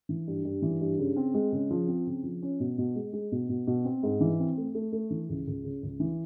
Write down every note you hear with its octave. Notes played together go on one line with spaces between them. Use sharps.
E3
G2
G2
E3
G2
C#3
C4
G#3
C#3
F3
C4
C#3
F3
C#4
B2
B2
G#3
G#3
B2
B2
B2
C4
G#2
E3
C4
A3
A3
A3
E3
C#2
C#2
C#3
C#2
E3